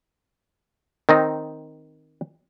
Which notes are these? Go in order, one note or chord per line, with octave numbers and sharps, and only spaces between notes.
D#3 C4 D#4